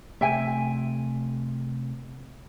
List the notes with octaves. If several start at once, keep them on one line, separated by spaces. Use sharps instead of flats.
C3 A3 E5 G5 G#5